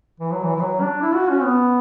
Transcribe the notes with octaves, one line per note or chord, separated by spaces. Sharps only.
E3
F#3
E3
E3
F#3
D4
E4
F#4
C#4
B3